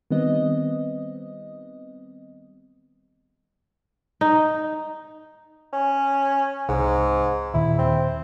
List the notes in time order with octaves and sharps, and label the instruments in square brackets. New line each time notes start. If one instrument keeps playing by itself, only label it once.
[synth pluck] D#3 G3 B3 C4 D#5
[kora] D#4
[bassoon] C#4
[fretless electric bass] C2 [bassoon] G#2
[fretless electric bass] D#2 A#2 D#3 [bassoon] E4
[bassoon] C4